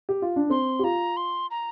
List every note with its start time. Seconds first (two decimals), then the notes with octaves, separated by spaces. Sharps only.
0.09 G4
0.22 F4
0.36 D4
0.50 C4 C6
0.79 G4
0.83 F4 A#5
1.17 C6
1.51 A#5